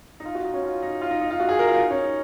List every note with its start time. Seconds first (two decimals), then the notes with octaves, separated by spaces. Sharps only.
0.20 D#4
0.25 F4
0.35 F#4
0.45 D#4
0.54 C#4
0.64 F4
0.82 D#4
1.02 F4
1.11 D#4
1.21 D#4
1.30 F4
1.40 F#4
1.49 G#4
1.59 A#4
1.68 F4
1.78 D#4
1.90 C#4
2.03 D#4